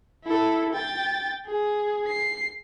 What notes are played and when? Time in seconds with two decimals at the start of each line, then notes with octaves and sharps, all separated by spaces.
0.25 E4 A4
0.73 G5 A6
1.46 G#4
2.08 C7